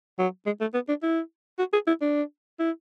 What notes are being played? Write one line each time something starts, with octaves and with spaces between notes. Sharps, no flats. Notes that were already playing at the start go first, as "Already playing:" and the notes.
F#3
G#3
A3
B3
D4
E4
F#4
G#4
E4
D4
E4